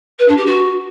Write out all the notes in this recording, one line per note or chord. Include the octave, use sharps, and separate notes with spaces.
B4
D4
G4
F#4